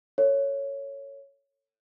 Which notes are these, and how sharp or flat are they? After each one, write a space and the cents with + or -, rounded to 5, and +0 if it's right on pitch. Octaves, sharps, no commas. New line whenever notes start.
A4 +35 C#5 +0